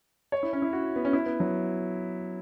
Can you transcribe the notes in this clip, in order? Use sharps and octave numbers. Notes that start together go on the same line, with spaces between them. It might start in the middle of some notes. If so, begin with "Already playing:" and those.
C#5
E4
C#4
E4
F#4
B3
C#4
E4
B3
F#3